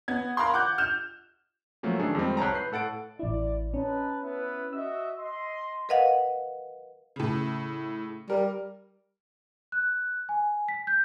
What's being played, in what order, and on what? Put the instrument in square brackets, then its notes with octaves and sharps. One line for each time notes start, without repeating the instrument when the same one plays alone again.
[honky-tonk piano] B3 G#6
A#4 F5 B5 C6
F#5 D6 F#6 G6
F6 G6 E7
[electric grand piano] F3 F#3 A3 A#3 C#4
D#3 A3 D4 G#4 A4
F2 D#3 G3 G#3 C4
C2 C#5 A5 A#5
B4 G6 C7
A2 A4 F#5 A6 D7
[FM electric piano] A1 E4 [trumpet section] D5
[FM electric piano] C#4 [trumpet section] D#4 B4 A5
[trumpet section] B3 E4 B4
[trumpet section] F#4 D#5 E5 [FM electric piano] E6
[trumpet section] D#5 C6
[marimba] A#4 B4 D#5 F5 F#5
[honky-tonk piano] A2 C#3
[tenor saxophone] G3 [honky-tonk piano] A#4
[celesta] F#6
G#5
B6
G6